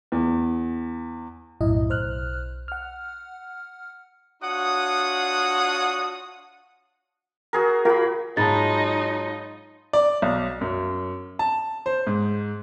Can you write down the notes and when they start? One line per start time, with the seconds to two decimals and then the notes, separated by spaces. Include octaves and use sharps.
0.12 E2
1.61 B1 F#2 A2 E4 D#5
1.89 B1 C5 F6 F#6
2.68 F#5 F6
4.42 D4 F4 F#4 C#5 F#5 D#6
7.53 F#4 G#4 A#4
7.85 F4 F#4 A#4 B5
8.37 G#2 F#3 D#4 F4 A5 B5 A6
9.93 D5
10.22 B1
10.61 F#2
11.39 A5
11.86 C5
12.07 G#2